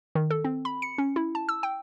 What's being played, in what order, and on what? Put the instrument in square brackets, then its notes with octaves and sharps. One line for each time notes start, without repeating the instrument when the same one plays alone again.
[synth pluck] D#3
A4
C4
B5
C#7
C#4
E4
A5
E6
G5